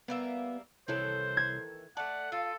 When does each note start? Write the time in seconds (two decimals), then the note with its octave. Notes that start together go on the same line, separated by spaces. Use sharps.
0.08 G3 A#3 B3 E5
0.88 C2 D#3 E3 E4 A4 C5 C#5
1.37 G#6
1.97 A3 D5 F#5 A5
2.32 F4 A4